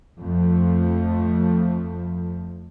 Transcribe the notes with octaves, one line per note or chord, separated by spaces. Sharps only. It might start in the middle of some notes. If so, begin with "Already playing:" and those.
F2 F3 A3